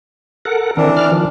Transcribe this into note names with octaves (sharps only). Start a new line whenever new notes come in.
A4 A#4 F#5
D#3 E3 C4 D4 A#4
D5 F6
D#3 F3